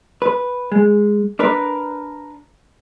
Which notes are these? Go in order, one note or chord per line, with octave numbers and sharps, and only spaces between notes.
B4
G#3
D4 A#4 B4